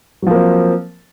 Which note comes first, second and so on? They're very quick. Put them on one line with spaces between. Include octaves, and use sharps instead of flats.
F#3 F3 A#3 C4